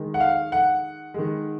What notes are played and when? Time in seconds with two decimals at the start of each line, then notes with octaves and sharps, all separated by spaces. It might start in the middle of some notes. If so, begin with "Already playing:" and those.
Already playing: D#3 G#3
0.14 F#5
0.20 F5
0.52 F#5
1.14 D#3 G#3